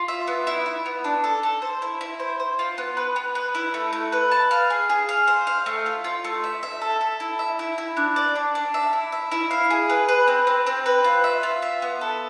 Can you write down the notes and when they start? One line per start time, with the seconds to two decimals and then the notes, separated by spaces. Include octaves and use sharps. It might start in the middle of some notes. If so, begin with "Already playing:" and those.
Already playing: F4
0.08 E5
0.27 B3
0.47 E4
0.66 E4
0.86 B3
1.04 D4
1.24 A4
1.43 A4
1.62 C5
1.82 E4
2.01 E4
2.20 C5
2.40 C5
2.59 F4
2.78 B3
2.97 B4
3.16 B3
3.35 B4
3.55 E4
3.74 A3
3.93 A3
4.12 B4
4.31 A5
4.51 F5
4.70 G#4
4.90 G#4
5.09 F5
5.28 C5
5.47 F5
5.66 A3
5.86 F4
6.04 F4
6.25 A3
6.44 E5
6.63 E5
6.81 A4
7.01 A4
7.20 E4
7.39 E5
7.59 E4
7.78 E4
7.97 D4
8.16 D5
8.36 D4
8.55 D4
8.74 E5
8.93 E4
9.12 E5
9.32 E4
9.51 F5
9.70 G#4
9.90 B4
10.09 B4
10.28 C4
10.47 C4
10.67 C4
10.86 B4
11.04 F4
11.24 E5
11.43 F4
11.62 E5
11.82 B3
12.01 A4